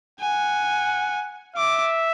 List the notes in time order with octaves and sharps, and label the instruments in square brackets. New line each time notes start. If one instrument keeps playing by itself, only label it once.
[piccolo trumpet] F#5 [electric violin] G#5
[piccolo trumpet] E5 [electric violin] D6